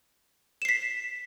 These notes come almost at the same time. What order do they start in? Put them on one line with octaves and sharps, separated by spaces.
E7 C7 B6